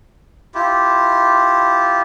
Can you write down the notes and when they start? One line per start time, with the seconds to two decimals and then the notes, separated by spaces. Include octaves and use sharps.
0.54 E4 F4 G4